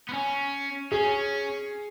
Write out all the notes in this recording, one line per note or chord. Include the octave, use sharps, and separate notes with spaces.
B3
C#4
C#4 G#4